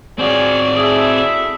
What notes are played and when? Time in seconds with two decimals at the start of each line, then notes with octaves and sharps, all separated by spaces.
0.19 C4 F4 F#4 G#4 C#5 D5
0.76 E4 G#4 A4 E5